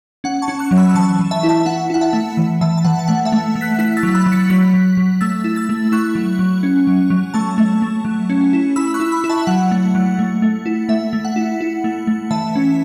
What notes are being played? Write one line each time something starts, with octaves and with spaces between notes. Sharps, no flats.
C#4 F#5
A5 C#6
C#4
C#6 F#6
F#3
B5 E6
E6
E3 A5 C#6
E3
E5 A5
E4
E5 A5
E4 F#5
E4 F#5
E5 A5
A3
E3
E3 E5 A5
A5
E3 F#5
A5
A3 F#5
E5 A5
A3
A3
F#6 B6
E4 F#6 B6
E6 A6
F#3
B5 E6
F#3
A6 C#7
F#3 F#6 B6
F#3
F#3
A3 E6 A6
E4
E6 A6
A3
E4 C#6 F#6
F#3
F#3
C#4
F#3
F#3
A3 A5 C#6
A3
A3
F#3
C#4
E4
E4 B5 E6
C#6 F#6
E4
B5 E6
E4
E5 A5
F#3 F#5
A3
F#3
A3
A3
E4
A3 E5
A3
F#5
E4
E4
A3
A3
E3 E5 A5
C#4